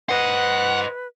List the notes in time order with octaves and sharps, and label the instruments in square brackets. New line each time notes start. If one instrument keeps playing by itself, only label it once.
[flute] B4 [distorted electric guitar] C5 D#5 [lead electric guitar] F#5